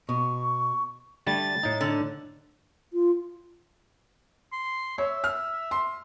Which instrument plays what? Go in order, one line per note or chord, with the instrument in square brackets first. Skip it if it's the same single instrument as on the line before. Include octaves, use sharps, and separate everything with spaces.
[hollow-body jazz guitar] B2 [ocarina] C#6
[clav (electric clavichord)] D3 G3 A3 [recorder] A6
[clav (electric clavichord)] A2 D#4
[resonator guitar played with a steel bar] D3
[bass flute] F4
[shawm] C6
[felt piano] C#5 [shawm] E5
[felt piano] F6
C6